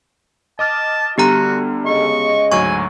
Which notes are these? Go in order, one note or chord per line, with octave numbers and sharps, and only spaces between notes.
D#5 A5 D6 F6
D3 G3 B3 F#4 G4 A#5 F6
C#3 G#3 D#5 C#6
D2 G#2 F#3 G#5 C#6